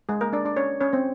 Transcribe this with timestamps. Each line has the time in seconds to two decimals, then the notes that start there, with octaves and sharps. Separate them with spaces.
0.09 G#3 G#4
0.21 A#3 A#4
0.33 D4 D5
0.45 D4 D5
0.57 C#4 C#5
0.81 C#4 C#5
0.93 C4 C5